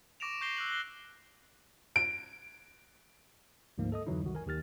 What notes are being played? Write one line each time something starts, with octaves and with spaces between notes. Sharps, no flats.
C#6 D6 A#6 D7 E7 F7
C#6 G6 A#6 C7 G7
E6 F#6 F#7
F#6 A#6 C7 G7
D7
D2 G#2 F3 A#3
A4 D#5 D#6
F2 D3 E3 F#3 D#4 E4
C2 D#3 F#4
A#4 G#5
D#2 D#3 G4 F6 A6